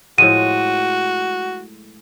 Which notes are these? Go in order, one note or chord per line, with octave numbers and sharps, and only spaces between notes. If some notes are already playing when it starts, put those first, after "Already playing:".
A2 F3 G#3 F#4 D#7